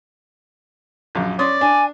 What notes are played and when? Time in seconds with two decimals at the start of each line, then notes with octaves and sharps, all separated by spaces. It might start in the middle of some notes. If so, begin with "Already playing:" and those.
1.15 A#1 F#2
1.39 C#4 D5 C6 D#6
1.61 D4 G#5